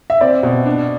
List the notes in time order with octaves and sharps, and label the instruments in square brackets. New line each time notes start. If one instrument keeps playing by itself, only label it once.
[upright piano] E5
C4 D5
B2
D4